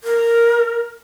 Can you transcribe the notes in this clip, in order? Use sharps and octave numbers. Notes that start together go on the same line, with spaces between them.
A#4